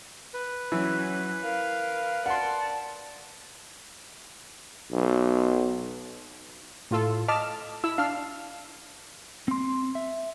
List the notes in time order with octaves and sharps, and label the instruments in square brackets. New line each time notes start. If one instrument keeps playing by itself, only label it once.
[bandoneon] B4
[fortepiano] E3 [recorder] F#3 [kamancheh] C#4
[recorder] A#4 [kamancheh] F5
[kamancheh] D5 A5 [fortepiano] F#5 C6
[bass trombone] B1
[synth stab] A2 F4 A4
[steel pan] D#5 A5 D6 [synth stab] F6
[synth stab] E4 [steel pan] E6
[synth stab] D4 F6 [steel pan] F5
[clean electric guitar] C4 C6
E5